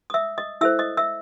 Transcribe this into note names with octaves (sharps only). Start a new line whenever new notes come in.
D#6
E5 E6
D#5 D#6
E4 A4 C5 E5 E6
D#5 D#6
E5 E6